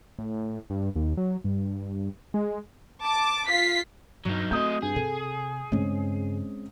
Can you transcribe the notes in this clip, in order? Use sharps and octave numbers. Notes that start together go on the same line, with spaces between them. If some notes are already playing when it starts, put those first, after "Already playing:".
A2
G2
D#2
F#3
G2
G#3
A5 D6
F4 B6 C7
G2 F#3 D#4
A3 C4 E4 F#4 D#5 D#6 G6
G2 G#4
C3 A4
G2 C#3 G#3 C4 C#4